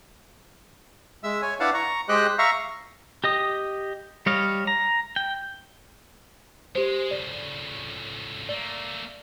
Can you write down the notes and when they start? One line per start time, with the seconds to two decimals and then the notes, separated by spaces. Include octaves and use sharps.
1.24 G#3 E5 E6
1.42 C#5 G#5
1.60 D4 E4 B4 F5 F#5 A5
1.74 A#5 C#6
2.09 G#3 G4 C5 D#5 G5 F#6
2.38 E5 F5 A#5 C#6
3.24 G4 D#5 D#6
4.26 G3 C#5 D#5 F5
4.67 A#5
5.16 G5
6.75 G#3 G4 C5
7.11 C#2 A2 D5
8.49 A3 A#3 D5